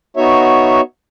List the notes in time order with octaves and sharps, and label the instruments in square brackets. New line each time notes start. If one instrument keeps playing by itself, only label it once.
[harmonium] B3 D#4 F#4 C#5 E5